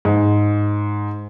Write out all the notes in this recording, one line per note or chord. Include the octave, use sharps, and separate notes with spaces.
G#2